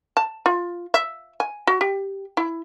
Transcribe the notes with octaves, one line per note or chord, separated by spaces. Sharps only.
A5
F4
E5
G#5
F#4
G4
E4